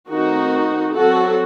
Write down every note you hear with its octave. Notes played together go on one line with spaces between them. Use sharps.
D#3 A3 C4 D#4 F#4
F#3 C4 F#4 A4